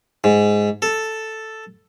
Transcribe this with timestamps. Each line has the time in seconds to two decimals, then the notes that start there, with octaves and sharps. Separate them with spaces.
0.24 G#2
0.82 A4